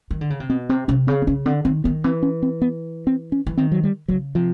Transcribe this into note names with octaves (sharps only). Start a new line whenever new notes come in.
D#3
D3
C#3
C3
B2 C4
C3 C4
C3 C#4
C#3 C4
C4
C#3 C#4
D3 C4
D#3 C4
D#3 B3
E3 C4
C#4
C4
B3
C4
C#4
E3
D#3 C4
F#3
G3
C#3 F#3
C3 F3